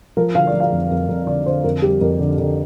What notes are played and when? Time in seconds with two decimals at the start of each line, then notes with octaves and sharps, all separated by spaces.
0.17 F3 A#4
0.35 D3 F5
0.47 D5
0.54 F3
0.60 F5
0.72 F2
0.91 F2
1.08 F2
1.27 D3 D5
1.46 D3 C5
1.64 F2 A#4
1.82 G3 G4
2.01 F2 A#4
2.19 D3
2.38 D3